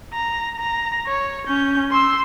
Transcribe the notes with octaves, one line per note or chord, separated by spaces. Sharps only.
A#5
A#5
C#5
C#4 G6
C6 E6